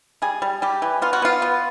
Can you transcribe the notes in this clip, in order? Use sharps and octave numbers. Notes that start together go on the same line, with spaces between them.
G3 G#4
G3
G3 G4
E3
B3 F4
F#4
B3 F4
B3